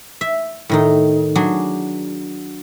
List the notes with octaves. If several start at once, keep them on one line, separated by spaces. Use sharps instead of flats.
E5
A2 D#3 D#4
F#3 D4 G#4